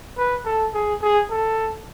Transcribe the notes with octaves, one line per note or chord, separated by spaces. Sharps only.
B4
A4
G#4
G#4
A4